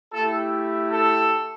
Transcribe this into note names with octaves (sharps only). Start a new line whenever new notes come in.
A3 E4 G4 A4
A4